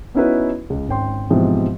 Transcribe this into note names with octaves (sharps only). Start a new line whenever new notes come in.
B3 C#4 D#4 E4 F#4 B4
C#2
G#1 C#4 G5 C6
G#2 B2 E3 F3 C4 G4